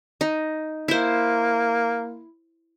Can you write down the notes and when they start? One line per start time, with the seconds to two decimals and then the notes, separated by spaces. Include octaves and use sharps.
0.21 D#4
0.88 A#3 E4 C5